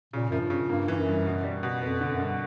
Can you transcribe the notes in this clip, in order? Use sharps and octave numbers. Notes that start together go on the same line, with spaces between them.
A#2 C#3
F#2 F3
G2
C#3
G2 A#3
G2 E3
F#2
G2
B2
G3
B2
F2 B3
D3
F#2
G2